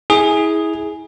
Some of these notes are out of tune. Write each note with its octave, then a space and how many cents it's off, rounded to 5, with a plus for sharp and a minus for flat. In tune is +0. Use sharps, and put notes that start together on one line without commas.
E4 -25 G#4 +0